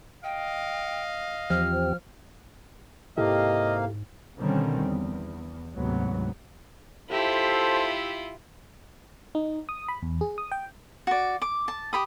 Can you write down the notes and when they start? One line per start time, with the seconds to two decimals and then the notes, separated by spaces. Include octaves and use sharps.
0.24 D#5 F5 G5
1.50 E2 F3 C4 G4 F6
3.18 G#2 C3 A#3 E4 G4 A4 D#5 F5
4.37 B2 D3 D#3 G3 C4 C#4
4.84 E2
5.74 D2 G#2 C3 F#3 B3
7.11 E4 F4 G4 A4 C5 E5
9.35 D#4
9.69 D#6
9.88 B5
10.02 E2
10.21 G#4
10.38 D#6
10.52 G5
11.07 F#4 D5
11.42 D6
11.68 A5
11.93 G4 B5 D#6